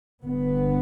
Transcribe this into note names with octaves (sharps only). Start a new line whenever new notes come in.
G1 G2 B3